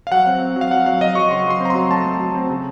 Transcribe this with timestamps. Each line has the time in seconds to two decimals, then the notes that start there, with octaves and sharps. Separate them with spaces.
0.07 F5
0.11 F#3 F#5
0.27 C4
0.41 C4
0.56 F#3
0.61 F5
0.71 F#3 F#5
0.86 F#3 F5
1.01 F#3 D#5
1.15 F#3 C#6
1.30 C#3 C6
1.46 F#3 C6
1.60 C4 A#5
1.70 C6
1.75 F#3
1.90 A3 A5
2.05 A3
2.20 F#3
2.35 C4
2.50 C#3